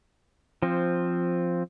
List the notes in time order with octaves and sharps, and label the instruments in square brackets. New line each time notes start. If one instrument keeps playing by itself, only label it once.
[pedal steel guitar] F3 C4